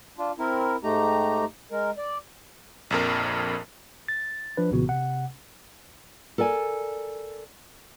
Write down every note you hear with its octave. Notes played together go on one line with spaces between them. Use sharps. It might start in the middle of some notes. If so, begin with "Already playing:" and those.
D4 F4
C4 E4 A#4
G#2 A3 D#4 G4 A#5
G#3 A#4
D5
A#1 F2 A#4
A6
F3 D4 B4
B1 A#2 C#3 E3 B3 F#4
C3 F#5
A4 A#4 D5 G#5